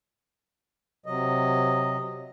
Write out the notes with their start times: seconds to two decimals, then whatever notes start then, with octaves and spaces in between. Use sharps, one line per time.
1.06 C3 F#3 D#5